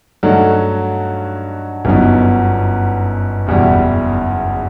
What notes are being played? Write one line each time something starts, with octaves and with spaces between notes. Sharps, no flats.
G2 F#3 A3 D#4 F#4
G1 F#2 F#3 B3 D#4
F#1 E2 B2 G3